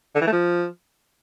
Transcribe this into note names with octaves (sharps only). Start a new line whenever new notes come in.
D3
E3
A3
F3